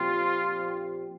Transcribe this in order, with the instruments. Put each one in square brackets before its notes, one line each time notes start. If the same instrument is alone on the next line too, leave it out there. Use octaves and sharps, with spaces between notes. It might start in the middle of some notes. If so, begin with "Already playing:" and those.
Already playing: [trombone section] A#2 F3 C4 G4 [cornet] F4